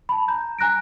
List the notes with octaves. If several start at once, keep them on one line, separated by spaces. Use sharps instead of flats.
A5 B5
A#5 G6
G#5 A#5 F#6 A#6 D7